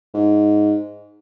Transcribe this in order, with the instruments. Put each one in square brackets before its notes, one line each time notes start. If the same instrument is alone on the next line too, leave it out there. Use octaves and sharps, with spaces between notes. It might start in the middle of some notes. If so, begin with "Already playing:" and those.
[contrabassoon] G#2